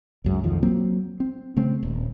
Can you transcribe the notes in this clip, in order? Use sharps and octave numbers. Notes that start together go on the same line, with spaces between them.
C#2 F#2 G#3
B1 F2 D#3 F3
F#3 A#3 C4
C4
C#3 A3 C4
D#1